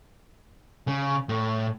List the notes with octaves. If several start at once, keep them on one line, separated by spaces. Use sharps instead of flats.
C#3
A2